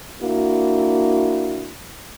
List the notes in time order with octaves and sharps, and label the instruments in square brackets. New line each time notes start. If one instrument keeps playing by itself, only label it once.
[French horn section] A#3 D4 E4 F#4